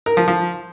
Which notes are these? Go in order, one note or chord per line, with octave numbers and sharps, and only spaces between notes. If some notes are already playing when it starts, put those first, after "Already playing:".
A#4
F3
F3